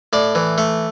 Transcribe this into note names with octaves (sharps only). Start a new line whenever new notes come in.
A2 D5
E3
A3